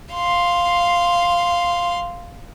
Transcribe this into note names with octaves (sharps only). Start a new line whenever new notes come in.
F5 C6